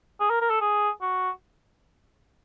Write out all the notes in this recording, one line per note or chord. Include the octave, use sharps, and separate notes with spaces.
G#4
A#4
A#4
A4
G#4
F#4